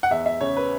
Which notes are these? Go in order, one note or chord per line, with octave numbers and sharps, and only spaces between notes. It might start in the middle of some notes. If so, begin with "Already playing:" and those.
F#5
E2 E5
E5
C#3 C#5
B4